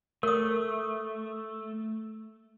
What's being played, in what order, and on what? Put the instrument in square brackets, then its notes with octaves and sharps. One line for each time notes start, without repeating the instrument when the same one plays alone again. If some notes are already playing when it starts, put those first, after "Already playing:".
[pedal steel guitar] A3 [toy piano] A#4 D#6